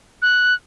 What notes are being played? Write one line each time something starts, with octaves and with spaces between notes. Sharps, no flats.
F#6